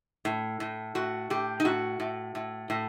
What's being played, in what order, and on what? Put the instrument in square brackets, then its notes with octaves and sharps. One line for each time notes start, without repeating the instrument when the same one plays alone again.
[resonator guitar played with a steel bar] A2
A2
A2 F#4
A2 G4
D#4
A2 F#4
A2
A2
A2